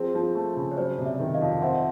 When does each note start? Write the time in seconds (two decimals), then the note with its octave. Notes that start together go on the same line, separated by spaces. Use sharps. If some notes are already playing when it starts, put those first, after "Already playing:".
Already playing: F3 C4 G#4
0.14 F3
0.35 A3
0.56 C#3
0.71 C#5
0.77 F#3 C5 D5
0.98 C3
1.05 D5 E5
1.20 D#3
1.34 D#5 F5
1.41 F2
1.61 C4 E5 F#5